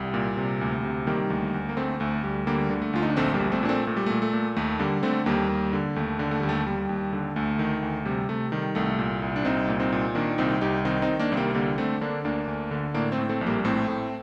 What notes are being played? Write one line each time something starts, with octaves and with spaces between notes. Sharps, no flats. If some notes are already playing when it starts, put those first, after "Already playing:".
Already playing: C2 G3
A#2
C3
D2
C3
D#3 G3 A#3
D2
D2
A#3
D2 A3 C4
D2 A3
D2 G3
D3 G3 A#3
D3
A3
D2 F4
D#4
D4
A#1 A3 C4
G3 A#3
A#1
A3 C4
A#2 D4
A3 C4
A#2 A3
G3
A#2 A3
A3
A#2
D#2 A3
D3 G3 A#3
D3 A3 C4
D#2 G3 A#3
D#2
D3
D#2 A3
D3
A3
D#2 G3
A3
D#2 G3
D#2
D3
D2 A3
D#3
D2
C3 G3
C3 A3
D#3 G3
C2 A3
A#2
C2
D4
C2 C4 D#4
A#2
C4 D#4
A#2
D#3 A#3 D4
C2 C4 D#4
C2 D#4 G4
D#3 C4 D#4
C4 D#4
D#3
A#3 D4
C2 C4
G3 A#3
D3 G3 A#3
D3 A3 C4
D3 A#3 D4
D2 A#3 D4
D2
D3
A2 A#3 D4
A3 C4
A2
A3 C4
A#1
G3 A#3
A2 A3 C4
A2